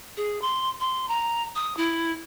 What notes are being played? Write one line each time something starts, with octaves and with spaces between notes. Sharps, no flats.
G#4
C6
C6
A#5
D#6
E4